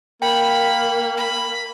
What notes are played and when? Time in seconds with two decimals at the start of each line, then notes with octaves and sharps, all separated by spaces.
0.22 A#3 G5 B5
1.17 B5